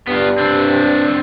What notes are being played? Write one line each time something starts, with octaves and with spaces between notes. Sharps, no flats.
G2 B3 F4
C4 D4